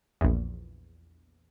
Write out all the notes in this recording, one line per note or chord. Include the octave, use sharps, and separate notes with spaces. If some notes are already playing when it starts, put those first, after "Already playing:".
A#1 E2